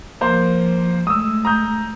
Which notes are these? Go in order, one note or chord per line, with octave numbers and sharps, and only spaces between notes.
F3 A#3 C5
G#3 A3 D#6 E6
A#5 D#6 G6